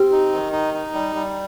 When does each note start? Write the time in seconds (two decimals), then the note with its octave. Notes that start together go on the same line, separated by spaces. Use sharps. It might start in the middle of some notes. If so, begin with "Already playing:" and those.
Already playing: C4 G4
0.12 D#4
0.33 D#3
0.52 D#4
0.74 D#4
0.94 G3
1.15 G3